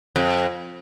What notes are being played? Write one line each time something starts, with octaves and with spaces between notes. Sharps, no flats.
F2